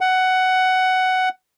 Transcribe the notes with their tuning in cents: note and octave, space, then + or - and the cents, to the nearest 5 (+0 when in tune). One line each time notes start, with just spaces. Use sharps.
F#5 +10